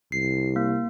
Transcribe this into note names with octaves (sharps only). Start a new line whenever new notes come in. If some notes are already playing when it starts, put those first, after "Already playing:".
C2 C7
A#3